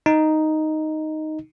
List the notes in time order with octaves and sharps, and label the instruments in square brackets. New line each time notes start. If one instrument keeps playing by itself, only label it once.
[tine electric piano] D#4